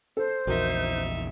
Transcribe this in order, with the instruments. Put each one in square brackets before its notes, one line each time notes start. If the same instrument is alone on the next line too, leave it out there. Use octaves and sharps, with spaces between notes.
[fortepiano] A4 [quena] C5
[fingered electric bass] A#1 E2 [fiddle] D#4 E5 [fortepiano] F#4 A#4